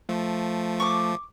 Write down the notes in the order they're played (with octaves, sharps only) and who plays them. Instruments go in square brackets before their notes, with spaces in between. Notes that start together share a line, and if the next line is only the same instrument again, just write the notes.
[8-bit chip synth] F3 [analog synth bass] A3
[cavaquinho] C#6 D6